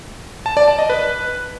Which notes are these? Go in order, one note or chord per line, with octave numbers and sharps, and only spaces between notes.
A5
D5
A5
D#5
B4